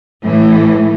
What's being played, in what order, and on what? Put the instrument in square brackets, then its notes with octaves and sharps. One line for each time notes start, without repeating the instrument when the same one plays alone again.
[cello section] A2 E3